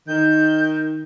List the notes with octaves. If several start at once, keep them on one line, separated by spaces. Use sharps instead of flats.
D#3 G6